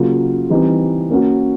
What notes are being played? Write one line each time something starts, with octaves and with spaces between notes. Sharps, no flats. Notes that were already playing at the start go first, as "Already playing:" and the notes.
Already playing: C#3 F#3 A#3 C#4 F4
E3 G3 C4 D#4
A#3 C#4 F#4